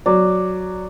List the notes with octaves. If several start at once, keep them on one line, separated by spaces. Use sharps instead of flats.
F#3 D5